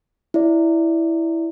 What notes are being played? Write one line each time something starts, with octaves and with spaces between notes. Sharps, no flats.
E4 D5